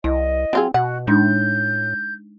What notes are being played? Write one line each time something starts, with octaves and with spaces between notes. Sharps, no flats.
C2 E4 D#5
F#3 C4 F4 G#4
B2 F#4 F#5
A2 G#3 D4 D#4 G6